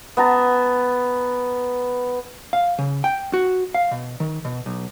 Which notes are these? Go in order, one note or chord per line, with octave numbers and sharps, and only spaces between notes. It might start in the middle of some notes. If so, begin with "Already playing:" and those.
B3 A5 A#5
F5
C#3
G5
F#4
F5
B2
D#3
B2
B1